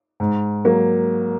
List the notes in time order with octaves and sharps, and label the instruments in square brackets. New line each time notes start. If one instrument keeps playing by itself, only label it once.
[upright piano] G#2
F#3 A#3